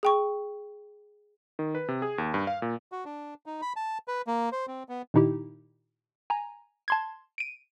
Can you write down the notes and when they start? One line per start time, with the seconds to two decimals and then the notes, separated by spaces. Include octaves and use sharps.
0.03 G#4 G5 C#6
1.59 D#3
1.75 B4
1.88 C3
2.02 G#4
2.18 D#2
2.34 G2
2.47 F5
2.62 A#2
2.92 F#4
3.05 D4
3.46 D#4
3.62 B5
3.76 A5
4.08 B4
4.27 A#3
4.52 C5
4.68 C4
4.89 B3
5.14 A#2 D#3 D#4 E4 G4
6.30 G#5 A#5
6.88 A5 C6 G#6
7.38 D7 D#7